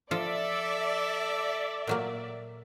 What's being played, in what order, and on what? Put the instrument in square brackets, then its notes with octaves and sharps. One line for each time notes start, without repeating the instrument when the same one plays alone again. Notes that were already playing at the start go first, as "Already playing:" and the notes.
[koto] F3 F4 [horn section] A4 [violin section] D5 E5
[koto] A#2 F#3 A#3